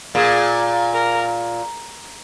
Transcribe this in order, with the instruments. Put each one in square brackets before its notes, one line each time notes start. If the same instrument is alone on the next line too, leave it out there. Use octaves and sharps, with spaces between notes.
[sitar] A#2 [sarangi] G#4
[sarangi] A#4